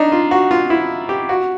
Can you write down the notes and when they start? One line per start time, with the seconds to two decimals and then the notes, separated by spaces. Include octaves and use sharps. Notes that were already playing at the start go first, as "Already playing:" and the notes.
Already playing: D4 D#4
0.12 F4
0.31 F#4
0.51 F4
0.70 E4
1.09 G4
1.29 F#4